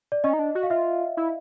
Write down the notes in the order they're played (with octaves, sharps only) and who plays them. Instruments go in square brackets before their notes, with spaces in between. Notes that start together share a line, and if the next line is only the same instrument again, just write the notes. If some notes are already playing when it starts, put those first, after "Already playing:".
[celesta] D5
[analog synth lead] C#4 [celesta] D#5
[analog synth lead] D#4
D4
F#4
[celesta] F5
[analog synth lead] F4 [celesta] E5
[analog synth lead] E4